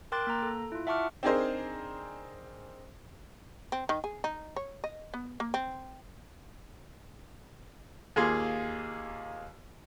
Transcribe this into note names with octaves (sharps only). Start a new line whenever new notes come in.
A#4 G5 C6 D6 F#6 A6
A#3 A#5
A4
E4 F4
E5 F#5 A5 C#6 D6 F6
C4 D4 D#4 G#4 A#4 C5
C4
D#3
G#4
D#4
C#5
D#5
B3
A#3
C4
D#2 A#3 F4 G#4 G#5 C6